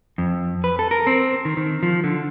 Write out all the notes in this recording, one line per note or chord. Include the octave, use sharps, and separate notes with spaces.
F2
B4
A4
A#4
C4
D#3
D#3
F3
D3